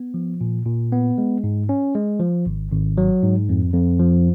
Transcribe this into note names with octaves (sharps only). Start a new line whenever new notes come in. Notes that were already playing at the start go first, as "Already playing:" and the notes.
Already playing: B3
F3
A#2
A#2
B3
G#3
G#2
C#4
G#3
F3
G#1
G#1
F#3
G#2
F2
F2
F3